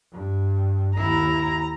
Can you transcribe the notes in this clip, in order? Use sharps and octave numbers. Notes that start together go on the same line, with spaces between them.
G2
D#2 E4 A#5